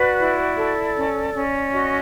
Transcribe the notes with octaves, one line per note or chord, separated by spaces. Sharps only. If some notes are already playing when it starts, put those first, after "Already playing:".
Already playing: F#4 B4 D5
E4
A4
C#4
C#4
F#4 D#5